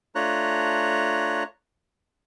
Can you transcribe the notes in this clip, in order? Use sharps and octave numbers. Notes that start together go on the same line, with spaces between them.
A3 D4 F4 C#5 A#5 F#6